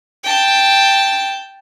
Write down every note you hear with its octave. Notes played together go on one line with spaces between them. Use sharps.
G5 A5